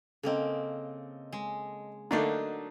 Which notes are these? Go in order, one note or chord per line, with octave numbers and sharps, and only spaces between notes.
C#3 A#3 C4 A4 D#5
G#3
D3 F#3 A3 A#3 D4 D#4 D#5